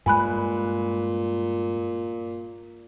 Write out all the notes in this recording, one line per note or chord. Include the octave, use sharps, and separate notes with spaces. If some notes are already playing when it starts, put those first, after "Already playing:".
G2 A#2 G#3 G#5 B5 F#6